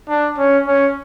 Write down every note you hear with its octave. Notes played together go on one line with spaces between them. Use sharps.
D4
C#4
C#4